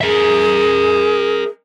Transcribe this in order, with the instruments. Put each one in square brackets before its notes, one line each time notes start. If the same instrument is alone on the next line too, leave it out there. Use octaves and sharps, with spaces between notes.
[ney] G#4 [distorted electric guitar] A#4 E5